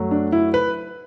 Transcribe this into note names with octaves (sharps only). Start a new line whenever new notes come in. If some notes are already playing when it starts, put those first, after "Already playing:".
Already playing: F#2 F#3 A3
D4
E4
B4